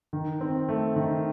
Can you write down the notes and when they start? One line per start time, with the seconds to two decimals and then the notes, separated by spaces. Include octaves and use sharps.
0.13 D#3
0.41 C4
0.69 A3
0.96 D#3